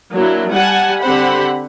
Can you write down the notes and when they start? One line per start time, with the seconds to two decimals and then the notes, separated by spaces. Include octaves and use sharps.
0.13 F#3 A#3 D4 E4
0.52 G3 F#5 G#5 A5
1.01 D3 C4 G4 C5 F#5 B5